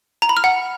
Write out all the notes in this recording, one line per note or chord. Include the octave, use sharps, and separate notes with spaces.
A#5
B5
F6
F#5